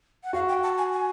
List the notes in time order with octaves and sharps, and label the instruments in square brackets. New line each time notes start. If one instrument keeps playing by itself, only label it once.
[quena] F#5
[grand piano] F#4 [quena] F5
[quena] G5
A5
G#5
G#5